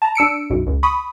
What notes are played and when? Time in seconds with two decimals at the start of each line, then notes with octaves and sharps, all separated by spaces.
0.02 A5 A#5
0.15 D4 E6 C#7 D7
0.50 B1 F#2
0.67 C#2
0.83 B5 C#6 D#6